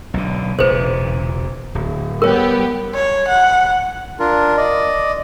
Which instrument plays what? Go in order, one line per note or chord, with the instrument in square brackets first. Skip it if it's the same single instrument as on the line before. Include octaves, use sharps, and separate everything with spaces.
[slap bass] B1 D3
[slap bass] E1 A#2 C#3 [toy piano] B4 C5
[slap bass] D1
[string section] G3 B3 G4 [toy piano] A#4 C#5
[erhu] C#5
F#5
[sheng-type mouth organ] D4 F4 A#4
D5 D#5